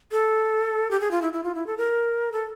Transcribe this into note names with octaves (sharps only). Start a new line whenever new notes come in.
A4
G4
G#4
F4
E4
E4
F4
E4
A4
A#4
A4